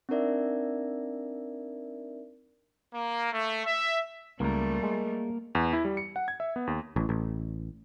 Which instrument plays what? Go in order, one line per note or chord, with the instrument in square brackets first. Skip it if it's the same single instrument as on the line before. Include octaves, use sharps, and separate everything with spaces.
[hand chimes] C4 D4 D#4 A#4 D5 E5
[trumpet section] A#3
A3
E5
[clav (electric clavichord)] C#2 [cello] G3 A3 [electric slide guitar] A#3 A#4
[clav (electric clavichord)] G#3
[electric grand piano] E2
E4
G3
C#7
F#5
G#6
E5
B3
D#2
[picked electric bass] A1
A1